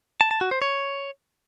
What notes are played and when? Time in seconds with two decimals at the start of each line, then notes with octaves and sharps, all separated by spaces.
0.21 A5
0.31 A5
0.41 F#4
0.51 C5
0.62 C#5